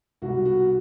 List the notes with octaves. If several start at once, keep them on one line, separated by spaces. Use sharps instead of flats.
C2 B2 G3 F#4
F#4